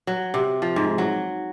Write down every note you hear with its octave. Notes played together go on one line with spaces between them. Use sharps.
F#3
C3
F3
G#2
F#3